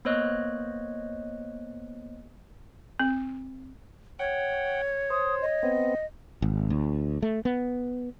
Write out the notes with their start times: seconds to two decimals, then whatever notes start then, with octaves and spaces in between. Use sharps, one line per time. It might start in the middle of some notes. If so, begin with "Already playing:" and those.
0.05 A#3 B3 C5 C#5 D#5 F#6
2.99 C4
4.19 C#5 F#5 G5
5.10 C5 D#6
5.42 D#5
5.63 B3 C4
6.42 G#1
6.70 D2
7.22 A3
7.45 B3